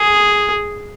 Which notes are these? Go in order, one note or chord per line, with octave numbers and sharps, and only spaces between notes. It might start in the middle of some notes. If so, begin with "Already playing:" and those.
Already playing: G#4